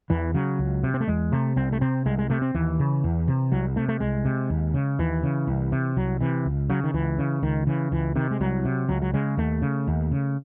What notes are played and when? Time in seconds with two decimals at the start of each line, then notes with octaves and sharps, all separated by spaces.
0.10 E2 E3
0.34 C#3 F#3
0.59 C#2
0.83 C3
0.94 C4
1.00 A3
1.08 E2 G#3
1.32 C3 A3
1.56 C2 C4
1.72 A3
1.81 C3 C4
2.06 C2 G#3
2.18 G#3
2.30 C3 A3
2.42 C4
2.55 D#2 E3
2.79 C#3
3.04 E2
3.28 C3
3.52 C2 F#3
3.76 C3 A3
3.89 A3
4.00 C2 G#3
4.25 C3
4.50 D#2
4.74 C#3
4.99 D#2 E3
5.23 C#3
5.47 C2
5.72 C3
5.97 C2 F#3
6.21 C3 E3
6.46 C#2
6.70 C#3 F#3
6.84 D#3
6.94 C#2 E3
7.19 C#3
7.43 C#2 D#3
7.67 C#3 E3
7.92 C#2 E3
8.16 C3 D#3
8.31 G#3
8.40 C2 F#3
8.65 C3
8.89 C#2 F#3
9.02 F#3
9.14 C#3 G#3
9.37 D#2 A3
9.62 C#3
9.87 D#2
10.12 C#3